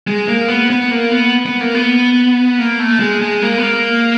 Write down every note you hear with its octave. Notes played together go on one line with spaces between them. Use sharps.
G#3
A#3
B3
B3
A#3
B3
B3
A#3
B3
A#3
A3
G#3
G#3
A#3
B3
A#3